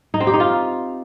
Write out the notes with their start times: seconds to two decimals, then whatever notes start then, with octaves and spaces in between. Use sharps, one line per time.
0.14 D#4
0.20 C4
0.27 G4
0.33 D#4
0.40 F4